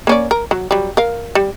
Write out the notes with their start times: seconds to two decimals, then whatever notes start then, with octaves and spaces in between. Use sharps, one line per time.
0.07 A#3 C#4 D5
0.31 A#4
0.51 F#3
0.71 F#3 G3
0.97 A#4 F5
1.35 G3